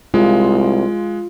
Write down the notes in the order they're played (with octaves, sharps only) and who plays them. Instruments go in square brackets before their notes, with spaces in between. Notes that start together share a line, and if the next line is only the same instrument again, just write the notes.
[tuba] C2 [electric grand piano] G#3 [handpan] F4